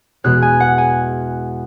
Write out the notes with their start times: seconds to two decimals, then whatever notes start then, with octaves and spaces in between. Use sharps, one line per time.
0.24 E2 B2 G#3 F#6
0.42 G#5
0.60 F#5
0.78 G#5